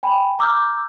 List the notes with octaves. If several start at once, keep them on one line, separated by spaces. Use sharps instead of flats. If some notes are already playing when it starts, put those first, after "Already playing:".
G5 G#5 B5
A#5 D6 E6 F6 G6